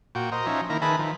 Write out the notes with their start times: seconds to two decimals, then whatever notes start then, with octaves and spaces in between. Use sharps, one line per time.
0.15 A#2 F#4 G5
0.32 A#4 C5 D#5
0.46 F3 C#4 D#4 E5
0.70 D#3 A#3 E4 A#5
0.82 D#3 G#4 B4 E5 A5 B5
0.99 D#3 F3